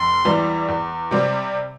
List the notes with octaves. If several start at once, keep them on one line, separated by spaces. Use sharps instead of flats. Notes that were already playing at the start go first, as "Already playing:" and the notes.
Already playing: F1 C6
E2 E3 G3
E2
C3 G3 C4